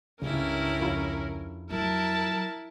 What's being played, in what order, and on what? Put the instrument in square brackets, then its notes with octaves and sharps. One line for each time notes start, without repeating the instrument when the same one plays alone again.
[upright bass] C#2 [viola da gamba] G2 E4 [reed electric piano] C#3 [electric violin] C#4 A#4
[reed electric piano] F2 F4 B5
[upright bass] F#3 [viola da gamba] E4 [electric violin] A#4 A5